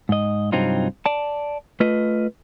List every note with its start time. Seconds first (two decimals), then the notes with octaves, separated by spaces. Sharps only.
0.09 G#2 D#5
0.52 G2 C3 F#3 C4 D#4 F4
1.06 D5 A5
1.80 A3 F4 B4 D#5